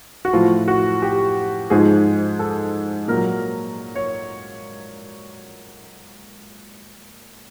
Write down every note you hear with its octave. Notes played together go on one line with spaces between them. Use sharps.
F#4
A2 F3 F4
F#4
G4
G#2 F3 G#4
A4
A#2 F#3 A#4
C#5